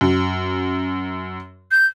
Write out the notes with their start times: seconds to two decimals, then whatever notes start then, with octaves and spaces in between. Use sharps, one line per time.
0.01 F#2
1.71 G6